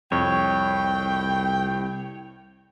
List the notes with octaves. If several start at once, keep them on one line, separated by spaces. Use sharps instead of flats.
C2 F2 C#5 G5